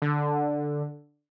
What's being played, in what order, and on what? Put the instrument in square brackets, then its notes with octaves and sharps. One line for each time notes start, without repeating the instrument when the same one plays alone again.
[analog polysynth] D3